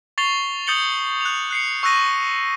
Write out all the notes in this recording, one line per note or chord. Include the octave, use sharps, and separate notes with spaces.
C#6 A6 C7 F7 G7
D#6 G6 A6 C#7 F#7 G7
F#6 F7
F#6 C7 C#7
C#6 E6 F#6 A#6 D#7